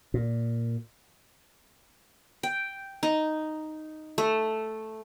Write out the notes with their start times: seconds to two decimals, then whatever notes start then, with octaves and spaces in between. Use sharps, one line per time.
0.14 A#2
2.43 G5
3.03 D#4
4.18 A3